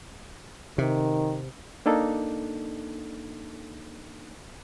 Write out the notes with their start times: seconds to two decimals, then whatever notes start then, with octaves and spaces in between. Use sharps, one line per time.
0.78 C3 D#3
1.86 A#3 D4 D#4 A4